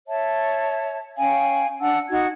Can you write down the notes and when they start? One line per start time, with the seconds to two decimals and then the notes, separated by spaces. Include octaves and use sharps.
0.07 C#5 E5 A5
1.17 C#4 F5 G5 G#5
1.81 D4 F#5 A5 E6
2.10 D#4 F#4 G#6